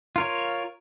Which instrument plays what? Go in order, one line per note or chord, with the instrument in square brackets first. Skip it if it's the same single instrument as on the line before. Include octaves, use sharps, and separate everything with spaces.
[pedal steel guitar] F4 A#4 C#5